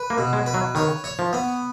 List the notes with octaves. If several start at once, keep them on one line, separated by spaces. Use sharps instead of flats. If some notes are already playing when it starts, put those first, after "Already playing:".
Already playing: B4
A#3
B2
G#3
B4
F#3
D#3 C#5
C#5
F3
B3